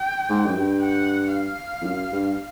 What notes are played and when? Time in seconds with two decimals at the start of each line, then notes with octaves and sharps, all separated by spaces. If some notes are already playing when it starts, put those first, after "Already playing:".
Already playing: G5
0.30 G#2
0.45 F#2
0.56 G2
0.82 F#5
1.34 F5
1.82 F2
1.86 F#2
2.12 G2